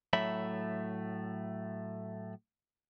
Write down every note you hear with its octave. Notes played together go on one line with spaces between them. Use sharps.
A2 F#3 A3 E5 B5